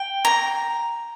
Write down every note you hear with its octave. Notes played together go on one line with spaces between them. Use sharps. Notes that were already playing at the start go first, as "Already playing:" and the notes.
Already playing: G5
A#5